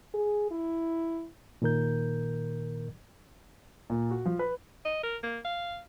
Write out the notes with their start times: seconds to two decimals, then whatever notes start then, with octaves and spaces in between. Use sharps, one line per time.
0.14 G#4
0.51 E4
1.62 A#2 D#3 A#4 G6
3.90 A#2
4.11 F#4
4.26 F3
4.39 B4
4.85 D#5
5.03 A#4
5.23 A#3
5.44 F5